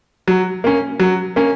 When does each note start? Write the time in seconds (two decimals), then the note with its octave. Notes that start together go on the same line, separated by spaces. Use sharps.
0.27 F#3
0.64 A#3 C#4
0.99 F#3
1.36 A#3 C#4